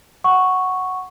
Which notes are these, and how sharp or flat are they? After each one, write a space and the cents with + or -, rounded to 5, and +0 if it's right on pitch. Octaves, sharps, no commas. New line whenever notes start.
F#5 +0 C#6 +0